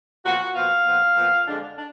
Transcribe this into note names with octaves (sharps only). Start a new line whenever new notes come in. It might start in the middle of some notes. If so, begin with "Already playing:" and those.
A#2 F3 B3 F#4
A#2 F3 B3 F5
A#2 F3 B3
A#2 F3 B3
F2 D3 G#3 D4
D4